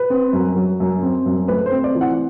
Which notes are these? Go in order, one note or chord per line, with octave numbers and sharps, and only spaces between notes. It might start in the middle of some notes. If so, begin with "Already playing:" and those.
Already playing: B4
C4
F#2
F#3
F#2
C4
F#2
A3 B4
C5
C4
D5
E3
F#5